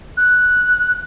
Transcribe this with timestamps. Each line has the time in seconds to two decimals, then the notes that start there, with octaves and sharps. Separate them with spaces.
0.17 F#6